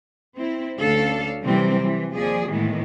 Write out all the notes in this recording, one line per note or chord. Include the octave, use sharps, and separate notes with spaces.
C4 E4
D2 C#4 D4 A4 F5
C3 E3 F#3 G3 C4
E3
D#2 F3 G#4 D5
A2 D#3 E3 G#3 B3